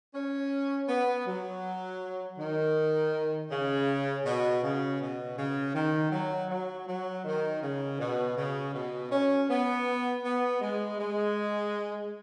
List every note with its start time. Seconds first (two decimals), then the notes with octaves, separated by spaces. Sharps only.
0.14 C#4
0.88 B3
1.26 F#3
2.38 D#3
3.50 C#3
4.24 B2
4.62 C#3
5.00 B2
5.37 C#3
5.75 D#3
6.12 F#3
6.49 F#3
6.87 F#3
7.25 D#3
7.61 C#3
7.99 B2
8.37 C#3
8.74 B2
9.11 C#4
9.49 B3
10.24 B3
10.61 G#3
10.99 G#3